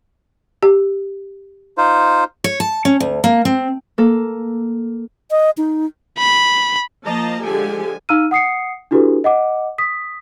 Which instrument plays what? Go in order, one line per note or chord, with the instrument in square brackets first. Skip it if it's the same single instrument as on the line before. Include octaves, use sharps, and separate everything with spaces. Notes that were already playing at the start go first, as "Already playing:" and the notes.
[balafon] G4
[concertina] D#4 F4 C5
[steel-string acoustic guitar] C#5
A5
C#4
D2
A#3
C4
[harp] A#3 A4
[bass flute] D#5
D#4
[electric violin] B5
[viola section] F3 A#3 D#5 A5 A#5
D3 F3 G#3 G4 A4 G#5
[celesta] D#4 F5 A#5 E6 F6 D#7
F#5 D#6 C7 C#7
D4 E4 F#4 G4 A4 B4
D#5 F#5 D6
D#6 B6